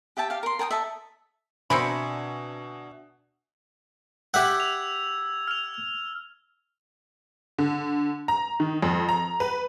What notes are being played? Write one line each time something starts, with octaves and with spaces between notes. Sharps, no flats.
G4 E5 G5 A5
G4 F5
A#4 C6
A#4 G5 A5 D#6
A4 D#5 E5
B2 C4 D4 A#4 E5 G#5 B5 C#7
G4 E5 F#5 E6 G#6
F7
F6 F7
D3
A#5
D#3
F2
A#5
B4